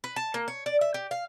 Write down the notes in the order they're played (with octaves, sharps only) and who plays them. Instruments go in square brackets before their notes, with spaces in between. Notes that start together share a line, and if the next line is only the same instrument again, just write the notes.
[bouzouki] B4
A5
A#3
C#5
D5
E5
G4
F5